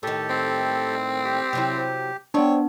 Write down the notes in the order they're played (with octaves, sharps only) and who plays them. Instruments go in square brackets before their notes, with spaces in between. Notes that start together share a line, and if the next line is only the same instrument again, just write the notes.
[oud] A2 D#3 [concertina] G4 A4
[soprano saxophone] C4
[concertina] G4
[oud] C3 F#3 E4
[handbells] B3 D4 [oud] C4 D5 [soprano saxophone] C#5